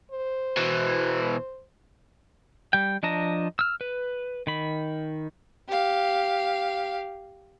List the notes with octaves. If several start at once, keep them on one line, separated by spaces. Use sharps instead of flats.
C5
B2 E3
G3 G5
F3 D4 D#5 A5 A#5
E6 F6
B4
D#3 B5
G4 F5